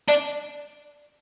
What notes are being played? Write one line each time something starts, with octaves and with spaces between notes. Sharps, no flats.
D4